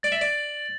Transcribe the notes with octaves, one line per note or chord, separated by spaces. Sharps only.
D5 A6 F#7
E5
D5